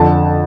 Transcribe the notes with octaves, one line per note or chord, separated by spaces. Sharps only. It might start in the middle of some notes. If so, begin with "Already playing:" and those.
Already playing: F2 D3 A5